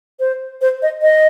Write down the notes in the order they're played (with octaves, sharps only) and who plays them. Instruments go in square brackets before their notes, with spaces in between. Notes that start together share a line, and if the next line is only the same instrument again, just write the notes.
[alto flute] C5
C5
D#5
D#5